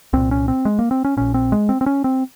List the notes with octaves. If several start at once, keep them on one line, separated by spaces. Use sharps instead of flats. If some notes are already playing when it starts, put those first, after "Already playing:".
C2 A#2 C4
C#4
C4
G#3
A#3
C4
C#4
A#1 A#2 C#4
C4
G#3
C4
C4
C#4
C4